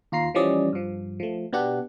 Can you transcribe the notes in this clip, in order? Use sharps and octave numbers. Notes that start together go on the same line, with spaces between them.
D#2 F4 A#5 C7
E3 F3 G3 C#4 D5 D#5
G2 F3
F3 A3
B2 B3 D4 G4 F#5